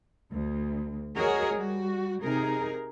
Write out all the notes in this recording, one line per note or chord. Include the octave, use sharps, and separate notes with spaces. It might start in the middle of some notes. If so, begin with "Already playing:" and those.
D2
F#4 G#4 A#4 C#5 D#5
G3 F#4
C3 D#4 G#4 A#4